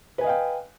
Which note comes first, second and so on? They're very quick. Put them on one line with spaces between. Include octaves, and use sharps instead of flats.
B4 G#5 D#5 F5 G5